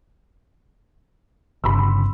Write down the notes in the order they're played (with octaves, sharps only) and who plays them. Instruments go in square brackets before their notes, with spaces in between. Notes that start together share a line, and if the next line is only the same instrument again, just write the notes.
[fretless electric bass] G1 C#3 [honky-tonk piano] B5 C6 E6